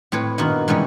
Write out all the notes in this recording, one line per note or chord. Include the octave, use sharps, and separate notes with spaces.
A2 C4 B4 C#5
G2 A#2 D#3 B3 F#4 A#4
G#2 B2 E3 G3 C#4